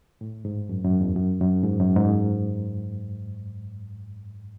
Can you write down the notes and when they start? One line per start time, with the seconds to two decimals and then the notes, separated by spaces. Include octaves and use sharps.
0.21 A2
0.45 G#2
0.69 F#2
0.84 F#2
1.01 E2
1.16 F#2
1.41 F#2
1.64 G#2
1.80 F#2
1.96 G#2